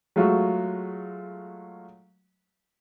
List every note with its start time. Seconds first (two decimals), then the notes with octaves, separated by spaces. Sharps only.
0.16 F#3 G#3 A3 F4 F#4